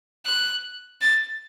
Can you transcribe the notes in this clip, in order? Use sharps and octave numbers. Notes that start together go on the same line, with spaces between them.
F#6
A6